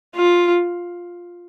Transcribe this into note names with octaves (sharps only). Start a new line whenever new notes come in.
F4